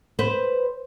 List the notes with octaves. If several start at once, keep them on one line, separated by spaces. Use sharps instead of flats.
B4 C5